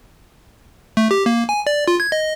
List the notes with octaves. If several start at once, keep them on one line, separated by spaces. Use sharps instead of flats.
A3
G4
A#3
G#5
D5
F4
G#6
D#5